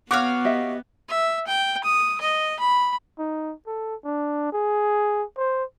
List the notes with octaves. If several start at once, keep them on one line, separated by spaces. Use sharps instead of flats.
B3 F#4 C#5 F5 D6 F#6
G4 D#5 E5
E5
G5
D#6
D#5
B5
D#4
A4
D4
G#4
C5